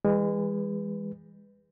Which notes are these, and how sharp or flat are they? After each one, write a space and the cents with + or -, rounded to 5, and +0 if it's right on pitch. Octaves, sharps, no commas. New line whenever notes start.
E3 +0 G#3 -30 B4 +0